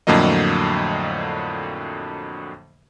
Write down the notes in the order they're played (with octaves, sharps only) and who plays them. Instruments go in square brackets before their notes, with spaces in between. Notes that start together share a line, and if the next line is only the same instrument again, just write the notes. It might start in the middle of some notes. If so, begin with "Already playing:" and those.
[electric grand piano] F2 A2 D3 F#3 A#3 D#5